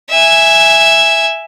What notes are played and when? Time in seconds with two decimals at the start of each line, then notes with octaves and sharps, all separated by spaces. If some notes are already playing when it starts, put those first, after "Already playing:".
0.10 E5 G#5